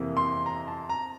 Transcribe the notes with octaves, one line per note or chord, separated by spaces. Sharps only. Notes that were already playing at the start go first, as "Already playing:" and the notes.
Already playing: F2 C3 E3 A#3
C6
A#5
A5
A#5